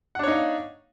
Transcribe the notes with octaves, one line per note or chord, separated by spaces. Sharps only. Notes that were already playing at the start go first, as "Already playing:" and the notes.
D4 D#4 C#5 F5 F#5